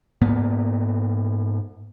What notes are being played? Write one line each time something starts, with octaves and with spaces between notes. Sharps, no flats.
G#2 A#3 B3